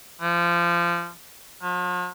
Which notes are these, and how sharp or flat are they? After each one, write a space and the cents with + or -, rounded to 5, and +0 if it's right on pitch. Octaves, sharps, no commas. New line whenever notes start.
F3 -25
F3 +45